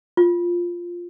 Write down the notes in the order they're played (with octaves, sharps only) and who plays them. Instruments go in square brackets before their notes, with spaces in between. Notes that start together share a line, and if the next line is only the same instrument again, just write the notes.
[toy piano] F4